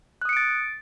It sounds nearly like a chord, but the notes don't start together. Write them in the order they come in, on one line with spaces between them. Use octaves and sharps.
F#6 D#6 C#7 D7 A6